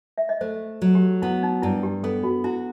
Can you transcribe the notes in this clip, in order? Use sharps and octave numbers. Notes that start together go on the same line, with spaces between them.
E5
D#5
A3 C5
F#3
G4
B3 E4
D#4
G2 E4
G4
B3 A4
F#4
E4 F#4